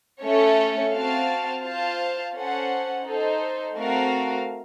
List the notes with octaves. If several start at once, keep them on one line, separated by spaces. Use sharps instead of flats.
A3 C#4 A4 C#5
C4 F#4 C5 F5 A5
F4 C5 F5 A5
C#4 A4 C5 F#5
D#4 A4 C5
A3 C4 F#4 A#4 F5